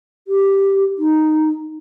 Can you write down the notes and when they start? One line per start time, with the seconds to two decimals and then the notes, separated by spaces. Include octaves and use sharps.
0.28 G4
0.98 D#4